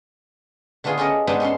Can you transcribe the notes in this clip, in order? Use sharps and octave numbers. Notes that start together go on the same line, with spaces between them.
D3 A3 B3 F4 G#4
C#4 F4 G4 A4 A#4 D#5
G#2 B3 D4 D#4 E5 G5
C#4 A4 E5 C6